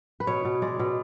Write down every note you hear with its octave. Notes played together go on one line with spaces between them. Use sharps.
B4
B2 C#5
B2
G#3 D5
B2